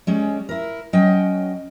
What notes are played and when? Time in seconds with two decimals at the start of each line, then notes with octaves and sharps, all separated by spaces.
0.07 G3 G#3 C#4
0.49 E4 A#4
0.93 F#3 C#4 D#5 G5